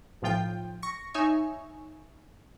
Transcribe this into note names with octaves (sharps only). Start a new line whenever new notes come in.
B1 A2 F3 F4 G5 G6
C#6 A#6 C#7
D#4 C#5 E5 G#5 C#6